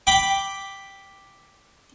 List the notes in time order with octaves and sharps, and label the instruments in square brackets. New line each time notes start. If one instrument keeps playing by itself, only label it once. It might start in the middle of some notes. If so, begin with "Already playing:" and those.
[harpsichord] G5 B5 D6